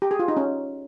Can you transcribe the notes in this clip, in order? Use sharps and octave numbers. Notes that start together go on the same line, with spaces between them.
G4
G#4
F4
D#4
C#4